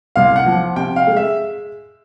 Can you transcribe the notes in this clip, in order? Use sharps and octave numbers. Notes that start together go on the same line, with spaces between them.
C2 F5
F#5
F3
C3 G5
F5
G#3
E5